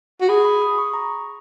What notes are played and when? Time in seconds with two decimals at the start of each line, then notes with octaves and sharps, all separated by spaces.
0.21 F#4
0.29 G#4 B5
0.45 B5
0.62 D#6
0.78 C#6
0.94 A#5